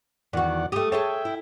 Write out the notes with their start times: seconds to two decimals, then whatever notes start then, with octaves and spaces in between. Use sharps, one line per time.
0.33 E2 D#3 F#4 D5 F#5
0.72 A3 G4 D#6
0.92 G#4 A4 C#5 E5 G5
1.25 E4